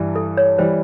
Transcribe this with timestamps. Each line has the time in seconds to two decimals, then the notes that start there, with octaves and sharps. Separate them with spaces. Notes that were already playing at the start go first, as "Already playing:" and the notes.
Already playing: G2 E3 G3
0.16 A4
0.37 C#5
0.58 E3 G3 C5